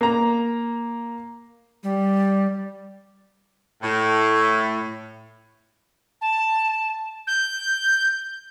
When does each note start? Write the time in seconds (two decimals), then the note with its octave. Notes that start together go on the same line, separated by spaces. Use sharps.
0.01 A#3 A#5
1.83 G3
3.82 A2
6.21 A5
7.27 G6